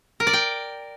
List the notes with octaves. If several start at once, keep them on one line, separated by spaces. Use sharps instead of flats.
A#4
D5
G5